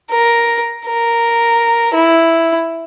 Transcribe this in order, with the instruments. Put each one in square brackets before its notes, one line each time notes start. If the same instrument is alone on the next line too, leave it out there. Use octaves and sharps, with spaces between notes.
[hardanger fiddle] A#4
A#4
E4